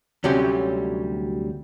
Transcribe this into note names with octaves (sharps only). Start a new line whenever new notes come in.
D2 C3 F#3 G3 C#4 G4